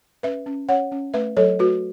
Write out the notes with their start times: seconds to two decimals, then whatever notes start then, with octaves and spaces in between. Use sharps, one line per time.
0.23 C#4 B4 E5
0.46 C#4
0.69 C#4 C#5 F#5
0.92 C#4
1.14 A3 B4 E5
1.37 F#3 A4 C#5
1.59 A3 F#4 B4